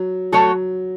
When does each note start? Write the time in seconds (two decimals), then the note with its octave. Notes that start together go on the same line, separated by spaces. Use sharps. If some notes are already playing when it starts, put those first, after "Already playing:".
Already playing: F#3
0.32 F#3 A3 F#4 A4 C#5